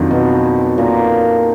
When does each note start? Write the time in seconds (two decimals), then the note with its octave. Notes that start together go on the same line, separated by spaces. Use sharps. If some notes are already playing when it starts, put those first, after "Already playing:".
Already playing: F2 D#3 F#3 D4 F4
0.11 B2
0.78 A#2